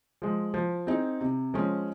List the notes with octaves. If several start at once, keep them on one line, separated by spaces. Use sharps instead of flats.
F3 G#3
F3
C4 D#4 G#4
C3
F3 G#3 C#4